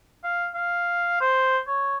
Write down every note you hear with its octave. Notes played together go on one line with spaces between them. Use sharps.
F5
F5
C5
C#5